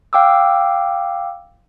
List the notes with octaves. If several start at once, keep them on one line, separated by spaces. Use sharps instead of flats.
F5 G5 D6 E6